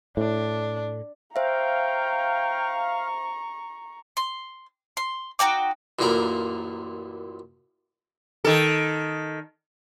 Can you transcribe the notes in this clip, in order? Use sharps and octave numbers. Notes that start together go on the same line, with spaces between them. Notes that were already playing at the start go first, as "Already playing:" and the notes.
A2 D4
C5 E5 F5 G5 A#5 C#6
C6
C6
D#4 F#4 G5 D6
A1 F#2 A#2 A#3 A#4 B5
D#3 A4